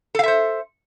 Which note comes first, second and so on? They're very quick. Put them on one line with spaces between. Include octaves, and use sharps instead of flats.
A4 F5 E5 C5